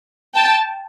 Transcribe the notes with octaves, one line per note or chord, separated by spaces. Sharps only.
G5 A5